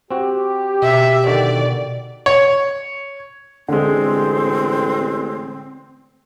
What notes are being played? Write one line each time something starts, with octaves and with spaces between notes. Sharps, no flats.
C4 F#4 G4
B2 E5
D3 D#3 F#4 D5
C#5
A1 D3 G#3 C4